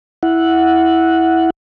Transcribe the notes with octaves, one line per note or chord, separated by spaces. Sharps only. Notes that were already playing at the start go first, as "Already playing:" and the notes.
E4 F#5